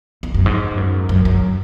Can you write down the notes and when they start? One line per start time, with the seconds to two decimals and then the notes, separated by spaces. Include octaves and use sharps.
0.23 E2
0.34 F#2
0.46 G#2
0.78 F#2
1.09 F#2
1.25 F#2